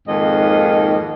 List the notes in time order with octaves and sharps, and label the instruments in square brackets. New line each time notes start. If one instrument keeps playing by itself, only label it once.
[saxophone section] F2 G#2 D#3 A#3 D#5